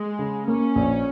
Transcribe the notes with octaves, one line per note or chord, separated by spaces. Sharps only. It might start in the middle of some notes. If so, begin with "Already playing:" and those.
Already playing: G#3
C#3
A#3 C#4
A#1